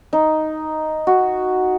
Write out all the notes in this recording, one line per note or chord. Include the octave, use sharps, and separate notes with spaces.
D#4
F#4